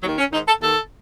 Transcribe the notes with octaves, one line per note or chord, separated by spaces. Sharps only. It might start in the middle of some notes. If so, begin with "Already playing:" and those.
D#2 D#3 F#3
C#4
G#2 D#3 D#4
A4
D#2 D#3 A4